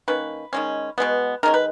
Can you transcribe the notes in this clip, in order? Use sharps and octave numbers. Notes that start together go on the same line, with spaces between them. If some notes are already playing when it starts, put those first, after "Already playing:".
D#3 A#3 C#4 B4
D#3 G#3 C#4
B2 G#3 B3
D#3 G#3 C#4 A#4
B4